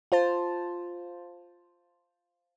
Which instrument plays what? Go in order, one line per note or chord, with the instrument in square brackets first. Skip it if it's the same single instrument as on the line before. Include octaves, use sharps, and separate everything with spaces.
[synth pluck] F4 C5 A5